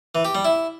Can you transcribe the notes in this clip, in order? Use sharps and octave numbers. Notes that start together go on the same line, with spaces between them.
E3
G4
G3
E4